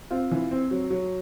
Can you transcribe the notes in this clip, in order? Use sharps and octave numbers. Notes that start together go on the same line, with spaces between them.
C4 F4
E3
C4
F#3
F#3